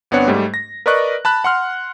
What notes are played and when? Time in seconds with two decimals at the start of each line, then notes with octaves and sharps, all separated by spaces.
0.11 G1 B3 C4 D4 C#5 F#5
0.28 G#2 G3 A3
0.54 A#6
0.86 A#4 B4 D5 D#5 C#6 F#6
1.25 A5 B5 F#6
1.44 F#5 C6 F6